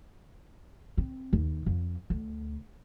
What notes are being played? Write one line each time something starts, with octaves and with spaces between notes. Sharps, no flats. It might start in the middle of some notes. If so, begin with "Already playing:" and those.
C4
D#2
F2
D2